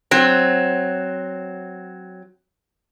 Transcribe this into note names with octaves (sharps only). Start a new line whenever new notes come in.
F#3 C4